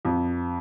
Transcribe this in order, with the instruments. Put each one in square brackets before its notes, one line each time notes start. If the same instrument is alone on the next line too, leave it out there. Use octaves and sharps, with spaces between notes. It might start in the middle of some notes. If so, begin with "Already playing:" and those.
[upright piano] F2